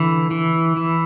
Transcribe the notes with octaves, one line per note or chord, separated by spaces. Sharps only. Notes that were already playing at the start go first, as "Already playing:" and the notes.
Already playing: D3 E3
E3
E3